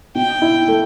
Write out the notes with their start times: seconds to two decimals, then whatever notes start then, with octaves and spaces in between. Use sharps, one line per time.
0.15 B2 G5
0.42 E4
0.68 A3